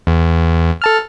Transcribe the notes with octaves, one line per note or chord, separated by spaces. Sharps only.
E2
A4 A5 F6